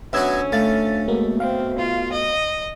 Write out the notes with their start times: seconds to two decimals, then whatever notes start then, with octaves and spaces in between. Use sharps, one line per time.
0.13 D2 B2 F#3 C#4 F#4 E5 E6 G#6
0.52 D2 A3 F5 A6
1.08 B2 G#3 A#3 B3
1.40 C4 F5
1.79 F4
2.12 D#5